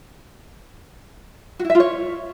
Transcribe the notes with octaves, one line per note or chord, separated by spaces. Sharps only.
F#4
E4
E5
F4
C#5